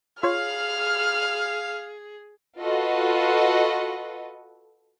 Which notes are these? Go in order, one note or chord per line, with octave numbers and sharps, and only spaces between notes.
F4 G#4 C#5 F5 F6
F4 F#4 A4 B4 D#5